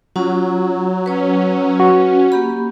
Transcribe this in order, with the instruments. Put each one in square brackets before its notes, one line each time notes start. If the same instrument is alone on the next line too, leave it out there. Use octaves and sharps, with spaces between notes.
[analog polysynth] F#3 [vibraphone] C#4 F4
[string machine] C#4 [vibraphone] B4 C#5
[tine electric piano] F#4
[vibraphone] A#3 G4 B5